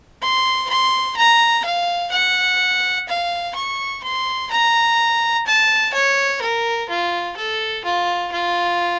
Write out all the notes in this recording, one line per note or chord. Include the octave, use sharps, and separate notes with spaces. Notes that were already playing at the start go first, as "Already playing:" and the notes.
C6
C6
A#5
F5
F#5
F5
C#6
C6
A#5
A5
C#5
A#4
F4
A4
F4
F4